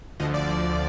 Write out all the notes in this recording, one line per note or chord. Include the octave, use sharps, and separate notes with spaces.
D2 D3 F3 D#5
D5
D2 D3 F3